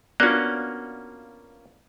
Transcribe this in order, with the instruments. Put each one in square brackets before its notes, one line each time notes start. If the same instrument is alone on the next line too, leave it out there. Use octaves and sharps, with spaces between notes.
[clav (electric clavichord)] A#3 C#4 [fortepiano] B3 D4 F4 [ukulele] F#4 D5 [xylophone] F#6